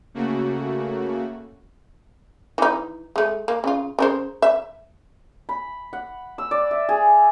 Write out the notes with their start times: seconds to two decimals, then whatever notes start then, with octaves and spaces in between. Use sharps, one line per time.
0.14 C#3 A3 A#3 F#4
2.58 E3 D#4
3.16 G#3 A3
3.48 A#3
3.64 C#3 F4
3.99 C#3 A#4 C5
4.42 E5
5.49 B5
5.93 F#5
6.38 E6
6.51 D5
6.71 E5
6.89 G#4